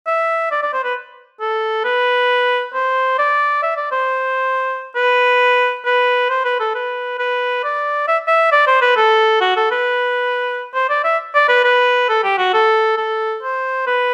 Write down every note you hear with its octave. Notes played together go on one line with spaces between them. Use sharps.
E5
D5
D5
C5
B4
A4
B4
C5
D5
E5
D5
C5
B4
B4
C5
B4
A4
B4
B4
D5
E5
E5
D5
C5
B4
A4
F#4
A4
B4
C5
D5
E5
D5
B4
B4
A4
G4
F#4
A4
A4
C5
B4